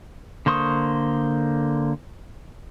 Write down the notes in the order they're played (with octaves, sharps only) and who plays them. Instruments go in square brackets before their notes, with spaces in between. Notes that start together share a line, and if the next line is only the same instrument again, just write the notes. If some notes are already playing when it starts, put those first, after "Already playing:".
[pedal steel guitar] D3 A#3 C5 C#6 D#6